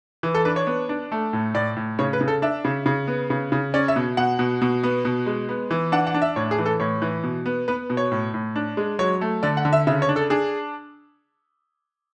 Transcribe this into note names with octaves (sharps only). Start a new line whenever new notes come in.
E3
A4
D4 B4
C#5
B3
D4
A3
A2
A2 D5
A2
C#3 C#5
B4
C#3
A4
D4 E5
C#3
C#3
B3
C#3
C#3
C#4 D5
E5
B2
B2 F#5
B2
B2
B3
B2
G#3
B3
E3
D4 F#5
F#5
D4
E5
A2 C#5
G#4
E3
A4
A2 C#5
E3
B2
B3
B3 B4
B2
C#5
A2
A2
D4
G#3
F#3 C#5
A3
D3 D5
F#5
D3
E5
C#3 E5
C#5
D4
A4
D4 G#4